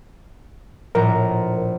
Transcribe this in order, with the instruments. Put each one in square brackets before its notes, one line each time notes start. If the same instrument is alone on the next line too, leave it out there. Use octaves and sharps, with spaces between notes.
[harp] A#1 A2 F3 [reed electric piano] A#4 A#5